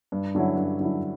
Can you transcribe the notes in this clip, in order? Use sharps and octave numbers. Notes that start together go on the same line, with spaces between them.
G2
D3 F#3 C#4 E4
G2
D3 F#3 C#4 E4